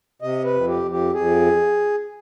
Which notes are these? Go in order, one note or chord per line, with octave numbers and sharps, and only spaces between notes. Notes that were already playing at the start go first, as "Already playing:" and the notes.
C3 D#5
B4
F2
G4
F2
G4
F2 G#4